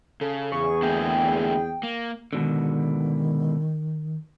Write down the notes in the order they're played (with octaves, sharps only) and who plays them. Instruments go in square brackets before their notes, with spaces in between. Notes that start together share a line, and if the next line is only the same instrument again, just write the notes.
[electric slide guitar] C#3 [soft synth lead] A4
[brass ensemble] E2 G#4 [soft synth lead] C#6
[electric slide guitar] D3 A3 A#3 [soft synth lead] G5
[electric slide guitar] A#3
[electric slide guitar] G#2 B2 D3 [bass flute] D#3